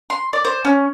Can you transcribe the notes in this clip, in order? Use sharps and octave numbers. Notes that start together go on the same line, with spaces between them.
C6
D5
C5
C#4